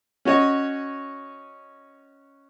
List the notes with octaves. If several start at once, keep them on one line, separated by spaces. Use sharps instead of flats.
C#4 F#4 C#5 D#5